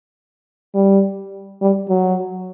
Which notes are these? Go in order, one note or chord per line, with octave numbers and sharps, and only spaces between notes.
G3
G3
F#3